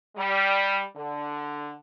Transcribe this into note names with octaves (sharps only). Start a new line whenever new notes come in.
G3
D3